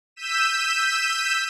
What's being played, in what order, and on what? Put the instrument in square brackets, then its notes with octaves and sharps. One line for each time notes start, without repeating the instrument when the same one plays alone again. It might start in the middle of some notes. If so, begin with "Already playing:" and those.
[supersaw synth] E6 G6 B6 D#7 E7